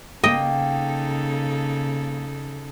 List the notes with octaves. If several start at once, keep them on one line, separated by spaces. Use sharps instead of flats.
C#3 A#3 D#4 A4 D#5 G5